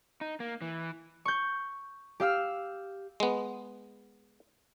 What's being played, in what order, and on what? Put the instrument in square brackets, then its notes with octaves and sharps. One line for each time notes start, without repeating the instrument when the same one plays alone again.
[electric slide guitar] D#4
A#3
E3
[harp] C#6 G6
G4 F5 E6 F6
[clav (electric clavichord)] G#3 B3